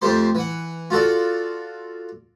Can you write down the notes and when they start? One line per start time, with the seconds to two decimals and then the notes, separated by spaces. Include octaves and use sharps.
0.02 F2 A3 G4 C5 C6
0.35 E3 F#5
0.90 F4 F#4 A4 D5